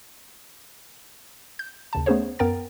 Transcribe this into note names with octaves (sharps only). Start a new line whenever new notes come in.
G6
D#2 C#3 A5
A3 B3 C#4 G#4 C5 C#5
F#2 B3 A#4 G5 A#5 A6